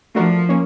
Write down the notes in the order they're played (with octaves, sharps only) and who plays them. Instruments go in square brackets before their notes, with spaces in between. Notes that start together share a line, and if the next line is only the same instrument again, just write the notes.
[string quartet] F3 [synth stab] A3 D4 F#4 A#4
[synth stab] A#3 C#4